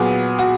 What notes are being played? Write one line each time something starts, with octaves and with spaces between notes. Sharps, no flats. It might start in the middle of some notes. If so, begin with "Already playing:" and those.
Already playing: A#2 F#3 B3 G#4
F#4